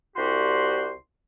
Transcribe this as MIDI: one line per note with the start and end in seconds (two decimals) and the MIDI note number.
0.16 0.90 36
0.16 0.90 66
0.16 0.90 67
0.16 0.90 84